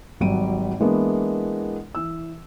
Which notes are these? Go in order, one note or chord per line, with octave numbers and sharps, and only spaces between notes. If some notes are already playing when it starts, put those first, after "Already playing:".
G#1 F#3 G3 D7 D#7
E3 G#3 A#3 B3 D4 E4
E3 E6